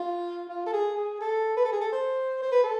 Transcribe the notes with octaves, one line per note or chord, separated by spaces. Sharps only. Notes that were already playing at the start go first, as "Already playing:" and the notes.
Already playing: F4
F4
A4
G#4
G#4
A4
B4
A4
G#4
A4
C5
C5
B4
A4